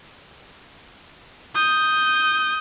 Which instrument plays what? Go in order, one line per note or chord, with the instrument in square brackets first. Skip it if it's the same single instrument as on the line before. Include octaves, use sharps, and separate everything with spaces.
[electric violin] D#6 G6